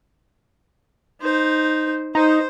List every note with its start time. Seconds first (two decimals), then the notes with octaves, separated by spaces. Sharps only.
1.22 D#4 C5
2.15 D#4 C5